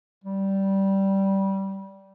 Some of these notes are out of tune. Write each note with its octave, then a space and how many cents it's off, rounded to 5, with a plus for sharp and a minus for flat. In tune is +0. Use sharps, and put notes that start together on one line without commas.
G3 -15